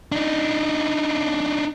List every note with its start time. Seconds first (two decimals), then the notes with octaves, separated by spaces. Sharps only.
0.12 D4 D#4